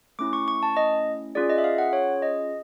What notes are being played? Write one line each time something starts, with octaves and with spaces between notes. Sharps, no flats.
A3 C#4 E4 D6
C#6
C#6
A5
D#5
C#4 F4 G#4 D5
D#5
E5
F5
F#5
C#5
D#5